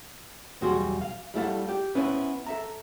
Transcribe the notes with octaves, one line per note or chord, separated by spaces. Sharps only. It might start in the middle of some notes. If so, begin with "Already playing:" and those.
B1 E2 G3 F#4 G#4 C6
F5
G3 A3 E4 A4 F5 F#5
G4
B3 C#4 E4 B4 C5
A4 E5 A#5